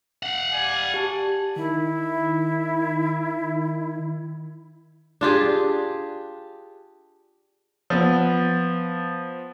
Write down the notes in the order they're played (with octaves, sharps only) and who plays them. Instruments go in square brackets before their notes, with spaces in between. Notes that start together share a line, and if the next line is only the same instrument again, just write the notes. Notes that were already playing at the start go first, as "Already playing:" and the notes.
[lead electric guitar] F5 F#5
[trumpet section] G3 D5 G#5
[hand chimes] G4 A5
[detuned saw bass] D#3 [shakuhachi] E4
[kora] D4 F4 G4 G#4
[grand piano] F3 B3